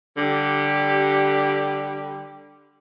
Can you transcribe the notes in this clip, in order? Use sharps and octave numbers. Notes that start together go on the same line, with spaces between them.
D3 G3 G4